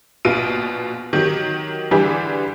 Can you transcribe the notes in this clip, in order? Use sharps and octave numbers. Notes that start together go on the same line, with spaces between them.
A#1 B2 F4 D7 D#7
D#3 F#3 G4
D3 E3 G3 G4 G#4